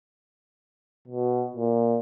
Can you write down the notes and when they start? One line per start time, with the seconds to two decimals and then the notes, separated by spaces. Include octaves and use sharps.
1.08 B2
1.56 A#2